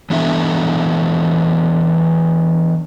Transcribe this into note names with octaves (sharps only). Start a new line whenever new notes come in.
E3 B3 D4 A4 E5